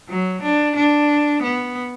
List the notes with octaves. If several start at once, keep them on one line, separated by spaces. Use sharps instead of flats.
F#3
D4
D4
B3